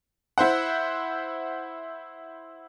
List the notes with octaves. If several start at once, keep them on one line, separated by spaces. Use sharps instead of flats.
E4 C5 F#5